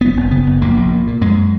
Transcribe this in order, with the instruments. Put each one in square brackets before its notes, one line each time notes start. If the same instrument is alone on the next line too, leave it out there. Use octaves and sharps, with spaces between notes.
[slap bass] F#1 B3
F#1
C#3 B3
F#1
A#1 A#3
A#1
A#2
A#2
F#2 G#3